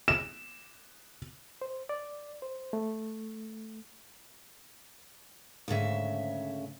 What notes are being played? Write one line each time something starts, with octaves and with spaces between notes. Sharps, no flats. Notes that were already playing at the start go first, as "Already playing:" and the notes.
E7
C5
D5
C5
A3
D2 G#2 C#3 E5